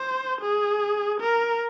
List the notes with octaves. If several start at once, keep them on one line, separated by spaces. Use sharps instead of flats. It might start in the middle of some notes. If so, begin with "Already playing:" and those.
Already playing: C5
G#4
A#4